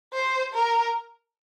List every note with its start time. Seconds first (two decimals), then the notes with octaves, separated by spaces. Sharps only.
0.13 C5
0.54 A#4